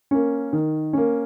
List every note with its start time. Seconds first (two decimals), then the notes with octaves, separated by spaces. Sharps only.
0.11 A#3 C#4
0.53 D#3
0.93 A#3 C#4